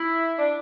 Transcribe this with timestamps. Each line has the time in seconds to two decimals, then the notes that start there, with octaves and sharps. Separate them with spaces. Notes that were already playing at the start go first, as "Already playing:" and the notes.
Already playing: E4
0.39 D4